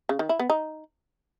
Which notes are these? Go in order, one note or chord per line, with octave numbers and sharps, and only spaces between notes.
C#3
D#3
E4
B3
D#4